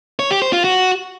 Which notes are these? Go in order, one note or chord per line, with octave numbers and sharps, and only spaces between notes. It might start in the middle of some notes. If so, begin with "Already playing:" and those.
C#5
G4
C5
F4
F#4